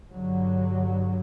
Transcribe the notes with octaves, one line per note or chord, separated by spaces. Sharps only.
G2 D3 F#3